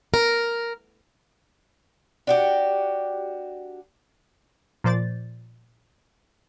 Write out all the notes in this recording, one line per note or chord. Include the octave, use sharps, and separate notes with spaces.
A#4
D4 F#4 G4
A#2 F3 C5 D5 A6